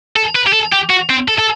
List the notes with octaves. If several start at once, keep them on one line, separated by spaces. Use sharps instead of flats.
A4
B4
G4
A4
G4
F#4
C4
A4
A4